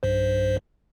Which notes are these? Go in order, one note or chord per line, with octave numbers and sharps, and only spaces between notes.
B1 G2 C5